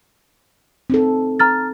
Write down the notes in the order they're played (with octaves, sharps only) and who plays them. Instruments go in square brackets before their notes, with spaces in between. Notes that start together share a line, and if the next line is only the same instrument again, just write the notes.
[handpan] C4 D#4 A4
[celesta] A#5 F6 A6